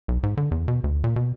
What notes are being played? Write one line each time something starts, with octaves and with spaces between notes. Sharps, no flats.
B1
G#2
D3
E2
B2
D2
A#2
B2